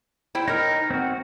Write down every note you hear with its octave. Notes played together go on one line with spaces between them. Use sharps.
E4 C5 G5
D#4 A#4 C#5
C4 F#4